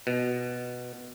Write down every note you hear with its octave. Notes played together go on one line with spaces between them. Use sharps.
B2